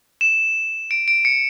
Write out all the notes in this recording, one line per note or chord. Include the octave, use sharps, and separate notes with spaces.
E7
D7
D7
C#7